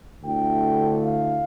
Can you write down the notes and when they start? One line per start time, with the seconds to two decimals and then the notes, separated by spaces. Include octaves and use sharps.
0.23 D2 D3 A3 E4 G5
1.03 F5